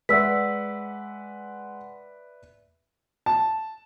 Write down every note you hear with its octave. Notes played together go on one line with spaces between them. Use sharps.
G#3 B4 D5 E5 F#5 E6 B6
A5